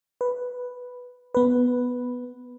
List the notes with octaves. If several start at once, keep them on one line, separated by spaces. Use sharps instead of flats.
B4
B3 B4